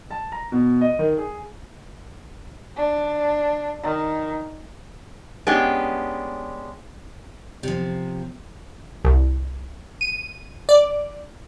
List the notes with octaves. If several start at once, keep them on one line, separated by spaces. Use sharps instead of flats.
A5
A#5
B2
D#5
D#3
G#4
D4
D#3
G#3 B3 C#4 D4 G4
C3 F3
C2
D#7
D5